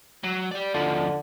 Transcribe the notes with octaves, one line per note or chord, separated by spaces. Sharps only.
F#3
G4 D5
D#2 D3 F3